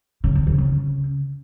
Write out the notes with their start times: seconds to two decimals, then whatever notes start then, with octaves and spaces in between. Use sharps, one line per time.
0.24 C#3
0.35 C#3
0.47 F2
0.58 C#3